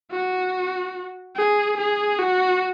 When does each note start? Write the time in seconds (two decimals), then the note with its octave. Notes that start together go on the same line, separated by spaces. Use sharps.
0.11 F#4
1.36 G#4
1.78 G#4
2.19 F#4